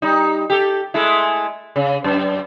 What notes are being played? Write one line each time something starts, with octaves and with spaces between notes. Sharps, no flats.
G3 D#4
G4 A4
G#3 A3 E4
C#3
F#2